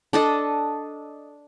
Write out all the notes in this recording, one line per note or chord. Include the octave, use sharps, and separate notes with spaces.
D4 A4 D#5